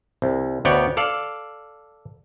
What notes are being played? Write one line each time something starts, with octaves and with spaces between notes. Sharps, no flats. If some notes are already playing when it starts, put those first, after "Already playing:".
C2
D2 B3 C#5 D5 G5
A4 D5 F5